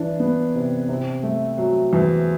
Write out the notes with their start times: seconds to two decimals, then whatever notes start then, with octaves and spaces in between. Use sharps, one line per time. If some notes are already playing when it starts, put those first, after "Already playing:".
Already playing: E3 D4
0.20 B3
0.55 C3
0.89 C3
1.23 A3
1.58 F#3
1.93 E2